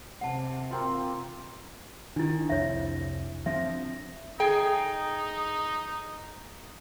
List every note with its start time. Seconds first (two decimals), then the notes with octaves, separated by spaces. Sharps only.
0.21 C3 F#5 A5
0.70 A#3 C4 F4
2.16 D#3 D4 E4
2.49 C2 F2 C#5 E5
3.46 F3 C4 D4 E5
4.40 D#4 G#4 G5